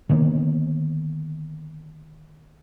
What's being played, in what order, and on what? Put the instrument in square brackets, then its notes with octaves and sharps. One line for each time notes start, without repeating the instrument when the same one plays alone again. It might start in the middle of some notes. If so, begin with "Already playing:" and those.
[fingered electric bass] D3 D#3 A#3 B3